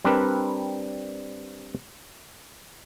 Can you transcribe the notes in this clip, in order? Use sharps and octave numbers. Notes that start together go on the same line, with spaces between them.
G3 C4 D4 A#4 B4